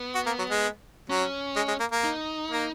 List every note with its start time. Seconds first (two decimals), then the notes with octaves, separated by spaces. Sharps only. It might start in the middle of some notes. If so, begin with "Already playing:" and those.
Already playing: B3
0.15 F#4
0.26 A#3
0.39 F#3
0.50 G#3
1.09 F#3 C#4
1.56 G#3
1.68 G#3
1.80 A#3
1.92 A#3
2.04 D#4
2.51 A#3